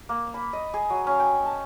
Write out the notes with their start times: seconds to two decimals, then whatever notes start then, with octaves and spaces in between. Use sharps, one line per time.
0.09 A#3
0.34 B5
0.53 D#5
0.74 G#4
0.90 F#3
1.07 C#4
1.19 G5
1.45 A5